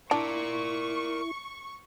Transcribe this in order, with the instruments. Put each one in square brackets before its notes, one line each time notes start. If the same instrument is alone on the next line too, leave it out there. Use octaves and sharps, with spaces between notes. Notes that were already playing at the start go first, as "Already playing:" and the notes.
[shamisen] D4 [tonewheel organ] E4 [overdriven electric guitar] A#4 D5 [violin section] C#6